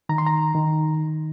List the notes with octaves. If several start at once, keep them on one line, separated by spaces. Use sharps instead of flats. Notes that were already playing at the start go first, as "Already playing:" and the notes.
D#3 A#5
C6
A#5
D#3